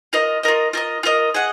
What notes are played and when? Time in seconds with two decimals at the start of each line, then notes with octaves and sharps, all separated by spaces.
0.13 F4 A#4 D#5
0.43 F4 A#4 D#5
0.73 F4 A#4 D#5
1.03 F4 A#4 D#5
1.34 G#4 D#5 F#5